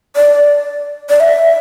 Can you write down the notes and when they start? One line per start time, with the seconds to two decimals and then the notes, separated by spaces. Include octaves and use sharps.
0.16 D5
1.09 D5
1.20 E5